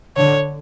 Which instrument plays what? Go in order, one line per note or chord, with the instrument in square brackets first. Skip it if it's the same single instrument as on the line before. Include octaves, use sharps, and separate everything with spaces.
[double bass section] D3 [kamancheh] C#5